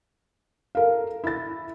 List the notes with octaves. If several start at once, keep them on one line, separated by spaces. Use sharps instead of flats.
A4 A#4 F5
E4 A6